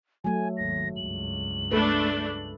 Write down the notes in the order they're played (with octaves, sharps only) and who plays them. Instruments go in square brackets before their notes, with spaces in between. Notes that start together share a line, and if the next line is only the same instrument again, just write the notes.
[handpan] F#3 A3 [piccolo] G#5
[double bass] G#1 D#2 [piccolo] A#6
[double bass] C#2 G2 [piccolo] F#7
[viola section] A3 D4 [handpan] A4 B4